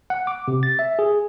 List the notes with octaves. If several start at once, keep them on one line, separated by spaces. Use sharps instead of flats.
F#5
D6
C3
A6
E5
G#4